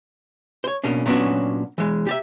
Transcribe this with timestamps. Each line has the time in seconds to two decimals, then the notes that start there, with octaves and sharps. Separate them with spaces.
0.64 C5 C#5
0.84 B2 A#3 C#4 D4
1.06 A#2 F#3 B3 C#4 D4 F#4
1.78 E3 G#3
2.07 G4 D5 E5